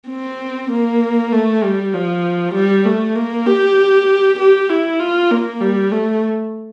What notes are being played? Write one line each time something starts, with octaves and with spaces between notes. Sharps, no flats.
C4
A#3
A3
G3
F3
G3
A3
A#3
G4
G4
E4
F4
A#3
G3
A3